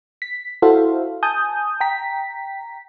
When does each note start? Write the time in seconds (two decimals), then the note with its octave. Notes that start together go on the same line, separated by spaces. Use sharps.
0.22 B6
0.62 E4 F#4 A4 C5 F5
1.23 G#5 A5 D#6 G6
1.81 G5 A#5 B6